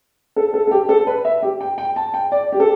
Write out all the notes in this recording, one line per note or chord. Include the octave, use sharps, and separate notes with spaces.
A4
A4
A4
G4
A4
B4
E5
G4
G5
G5
A5
G5
D5
G4
A4